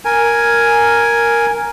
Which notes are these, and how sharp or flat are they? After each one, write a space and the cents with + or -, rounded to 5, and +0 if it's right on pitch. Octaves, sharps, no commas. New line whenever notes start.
A#4 +0 G#5 +0